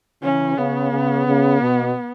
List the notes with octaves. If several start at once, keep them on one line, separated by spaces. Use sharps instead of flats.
C#3 E3 C#4
C#3 B3
C#3
C#3
B2